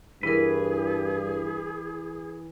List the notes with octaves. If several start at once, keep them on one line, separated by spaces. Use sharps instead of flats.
G2 E3 E4 G#4 A#4 B4